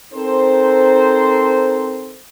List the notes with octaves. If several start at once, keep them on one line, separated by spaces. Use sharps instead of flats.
C4 D#4 A4 A#4 C5